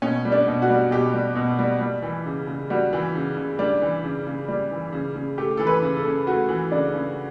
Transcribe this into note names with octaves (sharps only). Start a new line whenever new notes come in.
B2 C#4
G3
D4
B2
F#4
G3
B2 G4
G3
B2
G3
G3
E3
C#3
C#3
G3 F#4
E3
C#3
C#3
G3 D4
E3
C#3
C#3
G3
E3
C#3
C#3
A3 G4
E3 A4
B4
C#3
A4
C#3
A3 F#4
E3
C#3 D4
C#3